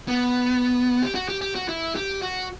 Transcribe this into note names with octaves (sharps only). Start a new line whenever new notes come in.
B3
G4
F#4
G4
G4
F#4
E4
G4
F#4